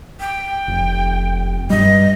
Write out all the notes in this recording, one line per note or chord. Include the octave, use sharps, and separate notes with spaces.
G5
F1
G2 G3 D#5